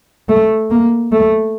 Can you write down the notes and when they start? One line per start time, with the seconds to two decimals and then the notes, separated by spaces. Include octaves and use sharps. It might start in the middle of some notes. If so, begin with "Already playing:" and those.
0.29 A3
0.70 A#3
1.12 A3